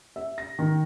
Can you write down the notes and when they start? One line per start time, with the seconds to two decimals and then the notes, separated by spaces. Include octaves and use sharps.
0.16 E5
0.38 A#6
0.59 D#3